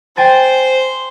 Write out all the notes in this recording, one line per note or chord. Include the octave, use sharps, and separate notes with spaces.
C5 G5 G#5 A6